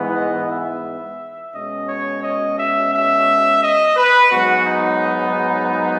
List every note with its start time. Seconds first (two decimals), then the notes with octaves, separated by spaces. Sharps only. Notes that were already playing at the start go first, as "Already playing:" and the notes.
Already playing: G#2 E3 B3
0.16 D#5
0.50 E5
1.54 B2 G#3 C#4 D#5
1.89 C#5
2.23 D#5
2.58 E5
2.92 E5
3.62 D#5
3.96 B4
4.31 G#2 F#3 B3 F#4
4.66 D#4